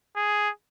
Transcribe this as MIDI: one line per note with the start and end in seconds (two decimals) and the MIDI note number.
0.16 0.49 68